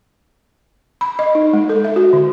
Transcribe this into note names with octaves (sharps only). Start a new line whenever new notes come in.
B5
D#5
D#4
G#3
A4
E5
F#4
D3